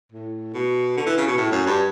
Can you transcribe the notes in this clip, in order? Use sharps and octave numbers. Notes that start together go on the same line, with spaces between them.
A2
B2
D3
E3
C#3
B2
A2
F#2
G2